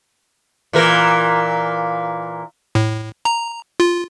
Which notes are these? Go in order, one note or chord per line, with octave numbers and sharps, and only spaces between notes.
A#2 E3 A#4
A2
A#5
F4